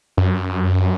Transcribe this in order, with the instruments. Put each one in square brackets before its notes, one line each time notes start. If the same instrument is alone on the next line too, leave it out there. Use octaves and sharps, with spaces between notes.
[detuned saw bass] F#2